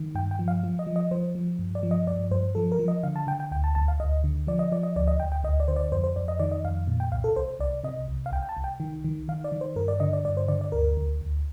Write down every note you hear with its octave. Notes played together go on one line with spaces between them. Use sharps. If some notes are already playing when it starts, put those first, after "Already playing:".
Already playing: D#3
G2 G5
G5
F3
F5
F3
D#5
F3
D#5
F3 C5
F3
G2
D5
F3
D#5
G2 D5
G2 C5
F3 A4
A#4
F3
D#5
D3 F5
A5
D3 G5
G5
D2 G5
A5
D2 A5
F5
D2 D#5
D3
F3 D5
D#5
F3 D5
D#5
D2 D5
D#5
D2 G5
G5
D2 D#5
D5
D3 C5
D5
F2 C5
C5
F2 D5
D#5
D#3 D5
D#5
F2 F5
A#2
G5
C2 F5
A4
C2 C5
C2 D5
C3 D#5
C2
F5
C2 G5
G5
A5
C2
G5
D#3
D#3
D#3 F5
D5
D#3
C5
G2 A#4
D5
D3 D#5
D5
G2 D5
C5
D3 D5
D5
D2 A#4
D2
D2